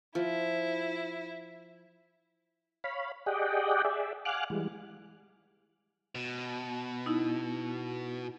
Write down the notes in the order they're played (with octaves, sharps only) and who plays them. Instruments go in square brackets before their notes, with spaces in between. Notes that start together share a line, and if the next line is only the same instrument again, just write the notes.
[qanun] F3 [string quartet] E4
[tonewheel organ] C#5 F5 B5
G4 G#4 D5 D#5 F#5 G5
G#4 D5 E5
F5 F#5 G#5 D6 F6 F#6
E3 G3 G#3
[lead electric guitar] B2
[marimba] D#4 E4